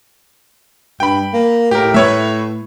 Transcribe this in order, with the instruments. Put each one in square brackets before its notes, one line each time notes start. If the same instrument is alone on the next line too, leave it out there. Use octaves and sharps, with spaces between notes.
[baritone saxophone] G2 [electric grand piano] G5 B5
[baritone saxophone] A#3
[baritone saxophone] A2 [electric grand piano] G4 A#4
[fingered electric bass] A3 [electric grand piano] B4 C#5 E5